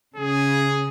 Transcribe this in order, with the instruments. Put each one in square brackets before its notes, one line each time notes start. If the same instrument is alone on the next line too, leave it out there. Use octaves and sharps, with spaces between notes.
[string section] C#3 [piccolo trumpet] G#4